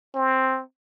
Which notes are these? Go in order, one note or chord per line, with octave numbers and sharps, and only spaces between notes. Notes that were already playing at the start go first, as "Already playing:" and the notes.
C4